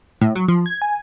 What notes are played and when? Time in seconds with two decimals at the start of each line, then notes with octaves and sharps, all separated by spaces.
0.21 A2
0.35 F#3
0.48 F3
0.66 G#6
0.82 G#5